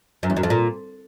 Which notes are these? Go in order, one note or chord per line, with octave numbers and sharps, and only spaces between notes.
F#2
E2
F#2
F2
A#2